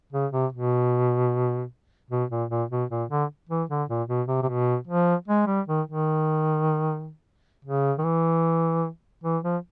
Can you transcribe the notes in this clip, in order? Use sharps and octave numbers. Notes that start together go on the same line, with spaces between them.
C#3
C3
B2
B2
A#2
A#2
B2
A#2
D3
E3
D3
A#2
B2
C3
C3
B2
F3
G#3
G3
D#3
D#3
C#3
D#3
E3
E3
F3